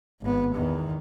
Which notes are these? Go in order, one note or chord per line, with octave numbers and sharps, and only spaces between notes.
G#1 B3
E2 D#3